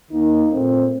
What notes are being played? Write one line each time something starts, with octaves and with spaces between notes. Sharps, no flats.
D#2 D#3 A#3 D#4
A#2 A3 C4